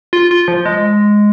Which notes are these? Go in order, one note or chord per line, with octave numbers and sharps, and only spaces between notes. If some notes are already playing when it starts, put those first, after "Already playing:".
F4
F4
F3
G#3